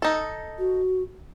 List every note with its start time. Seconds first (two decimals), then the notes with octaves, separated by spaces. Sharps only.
0.02 D#4 A4
0.58 F#4